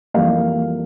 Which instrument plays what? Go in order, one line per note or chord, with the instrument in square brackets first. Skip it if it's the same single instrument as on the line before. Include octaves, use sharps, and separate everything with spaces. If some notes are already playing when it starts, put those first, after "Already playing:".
[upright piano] F2 E3 G3 A#3 F5